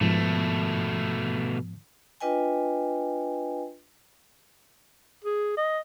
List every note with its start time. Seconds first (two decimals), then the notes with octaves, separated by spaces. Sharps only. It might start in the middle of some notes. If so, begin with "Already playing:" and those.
0.01 G#2 B2 F3 A3 B3
2.21 D4 F4 B4 D#5 G5 G#5
5.25 G#4
5.57 D#5